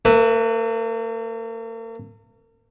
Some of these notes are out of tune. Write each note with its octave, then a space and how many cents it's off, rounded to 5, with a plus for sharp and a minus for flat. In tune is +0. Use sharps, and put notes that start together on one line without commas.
A#3 -45 B4 +0 E5 +0